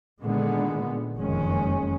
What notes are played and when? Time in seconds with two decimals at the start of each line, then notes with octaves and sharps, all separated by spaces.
0.22 A#2 D3 D#3 G#3 B3
1.16 F#1 F2 D#3 G#3 C#4